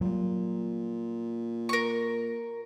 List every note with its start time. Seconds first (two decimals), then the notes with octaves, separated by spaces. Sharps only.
0.01 A#2 F#3 G3
1.69 A#4 C#6